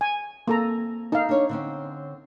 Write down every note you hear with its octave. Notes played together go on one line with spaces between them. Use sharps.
G#5
A#3 C4 A4 A#5
D#4 A4 F5
D4 C#5
D3 C4 C#4